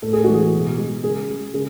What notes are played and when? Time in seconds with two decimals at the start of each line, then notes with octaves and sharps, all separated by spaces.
0.02 A2 A4
0.13 G#4
0.24 E3 G#3 F#4
0.34 G#4
0.53 B2
0.78 G#3
1.03 C#3 G#4
1.29 G#3
1.54 C#3 G#4